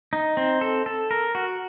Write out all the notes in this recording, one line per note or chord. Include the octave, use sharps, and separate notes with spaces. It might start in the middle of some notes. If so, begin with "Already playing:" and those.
D#4
C4
A4
A4
A#4
F#4